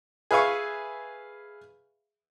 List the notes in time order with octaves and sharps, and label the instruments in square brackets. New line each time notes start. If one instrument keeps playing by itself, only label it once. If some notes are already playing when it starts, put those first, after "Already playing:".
[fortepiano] G#4 B4 E5 F5 C#6